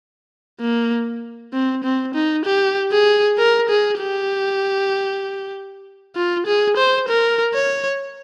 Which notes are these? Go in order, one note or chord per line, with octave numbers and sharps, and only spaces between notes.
A#3
C4
C4
D#4
G4
G#4
A#4
G#4
G4
F4
G#4
C5
A#4
C#5